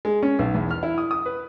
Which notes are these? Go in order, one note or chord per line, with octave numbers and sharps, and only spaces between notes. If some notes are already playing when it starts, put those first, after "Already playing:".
G#3
C#4
B1
E2
F6
E4
D#6
D#6
B4